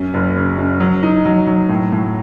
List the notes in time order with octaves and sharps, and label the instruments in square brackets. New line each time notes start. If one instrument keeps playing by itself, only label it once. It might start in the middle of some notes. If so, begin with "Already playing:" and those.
Already playing: [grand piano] F#2 C#4
F#1
C#3
F#2
F#3
D#4
F#3
F#3
A2
A2